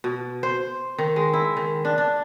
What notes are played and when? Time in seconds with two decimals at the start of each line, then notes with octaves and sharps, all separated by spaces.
0.04 B2
0.43 C5
0.98 D#3
1.16 G#3
1.33 E4
1.57 D#3
1.85 D4
1.98 D4